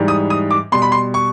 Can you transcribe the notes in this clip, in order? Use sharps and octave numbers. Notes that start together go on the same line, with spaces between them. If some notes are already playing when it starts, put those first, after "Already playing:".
Already playing: G#2 E3 G3
D#6
D#6
D6
B2 G3 C6
B5
C6
C#6